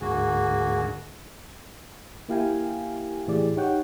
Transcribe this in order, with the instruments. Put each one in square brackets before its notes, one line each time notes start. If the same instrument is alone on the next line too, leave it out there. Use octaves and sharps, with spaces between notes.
[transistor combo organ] D2 G#2 G#4 [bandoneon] A#3 F#4
[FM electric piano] A#3 E4 G4 F5 G5 G#5
A2 E3 G4 G#4 D5
D#4 G4 C#5 F#5 G5